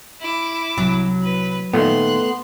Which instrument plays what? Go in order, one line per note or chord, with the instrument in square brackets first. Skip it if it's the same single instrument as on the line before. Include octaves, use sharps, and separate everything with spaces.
[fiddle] E4 D6
[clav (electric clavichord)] C2 [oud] F#3
[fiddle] B4
[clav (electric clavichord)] A#2 D#3 [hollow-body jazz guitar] A3 B3 [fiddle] C6 F#6